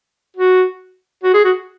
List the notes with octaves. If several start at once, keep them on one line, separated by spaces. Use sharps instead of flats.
F#4
F#4
G#4
F#4